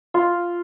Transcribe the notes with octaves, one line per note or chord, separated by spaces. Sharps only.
F4